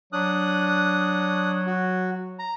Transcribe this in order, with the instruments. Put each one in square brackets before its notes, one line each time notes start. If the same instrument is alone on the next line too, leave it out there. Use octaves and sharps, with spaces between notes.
[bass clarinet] F#3 [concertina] D4 D#6 F#6
[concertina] F#4
A#5